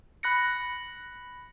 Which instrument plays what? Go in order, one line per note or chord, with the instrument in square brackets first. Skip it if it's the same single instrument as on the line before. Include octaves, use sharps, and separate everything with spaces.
[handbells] B5 F#6 A#6 C#7